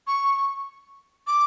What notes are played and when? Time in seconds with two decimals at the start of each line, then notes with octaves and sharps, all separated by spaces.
0.07 C#6
1.27 D6